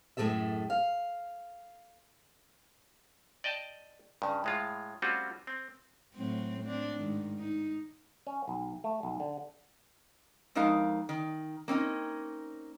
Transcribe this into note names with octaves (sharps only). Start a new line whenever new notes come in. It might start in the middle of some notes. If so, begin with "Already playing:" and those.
F#2 A2 F#3 G#4 A4 E5
F5
D5 D#5 G5 A5
G2 C#3
A2 G#3 F4
G3 A3 C4 C#4 F4 F#4
C4
A2 F#3 C4
C4 D4
G#2 D#3
D#4
C#4
B1
A3
B1
D3
F2 G#3 D#4 A#4 F5
D#3
A#3 C4 C#4 D#4